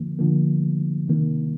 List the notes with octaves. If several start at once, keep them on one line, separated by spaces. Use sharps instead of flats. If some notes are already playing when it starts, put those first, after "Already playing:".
Already playing: D3 F3 A#3
D3 F3 A#3
C3 D#3 A#3